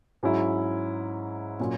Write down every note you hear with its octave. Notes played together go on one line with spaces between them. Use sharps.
G#2 F#3 C#4 E4
A#2 F#3 C#4